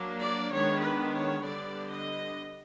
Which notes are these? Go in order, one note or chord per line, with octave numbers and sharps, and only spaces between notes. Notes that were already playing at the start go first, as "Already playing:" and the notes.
Already playing: F#3 A#3 D4
D5
D#3 G#3 B3 D4 C#5
B4
C#5
D3 G3 B3 D4 D5
D#5